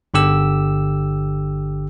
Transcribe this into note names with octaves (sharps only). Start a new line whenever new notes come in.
G1 D3 G4 E6